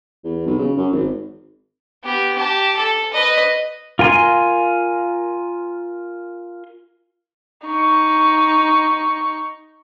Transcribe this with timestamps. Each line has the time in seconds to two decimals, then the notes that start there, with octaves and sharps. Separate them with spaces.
0.24 E2
0.46 B1
0.59 C#3
0.77 F#2
0.92 G#1
2.04 B3 G4
2.36 G4 A5
2.76 A4 A5
3.13 B4 D#5
3.99 F4 A#4 G#5 C6
7.67 D#4 C#6